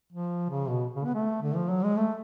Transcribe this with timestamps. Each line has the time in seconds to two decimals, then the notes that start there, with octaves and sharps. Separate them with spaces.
0.13 F3
0.50 C#3
0.68 B2
0.96 C#3
1.05 B3
1.14 A3
1.42 D3
1.56 F3
1.70 F#3
1.83 G#3
1.97 A3